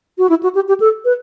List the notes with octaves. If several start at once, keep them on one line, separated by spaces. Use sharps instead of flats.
F#4
E4
F#4
G4
G4
A4
B4